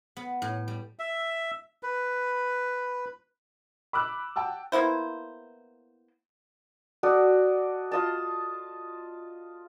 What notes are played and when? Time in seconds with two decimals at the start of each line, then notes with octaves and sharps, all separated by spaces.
0.17 B3
0.42 A2
0.68 G3
0.99 E5
1.83 B4
3.93 B5 D6 E6 F#6
4.36 F#5 G5 A5 E6
4.72 A#3 B3 E4 C5
7.03 F#4 A4 D5 D#5
7.92 F4 D#5 A5